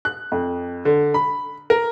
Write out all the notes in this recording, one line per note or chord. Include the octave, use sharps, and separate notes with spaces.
F#6
F2
D3
B5
A#4